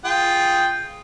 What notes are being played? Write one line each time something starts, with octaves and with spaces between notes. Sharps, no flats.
F4 G#4 G5